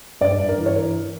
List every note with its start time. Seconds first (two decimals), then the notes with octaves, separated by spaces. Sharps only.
0.21 G2 D5
0.40 G2
0.49 A#4
0.58 E3
0.66 C#5
0.76 E3 A#4